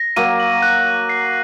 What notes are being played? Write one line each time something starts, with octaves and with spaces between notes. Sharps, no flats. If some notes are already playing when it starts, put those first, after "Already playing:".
Already playing: A#6
F#3 A#3 D#7
F#7
F#6
D#7
C7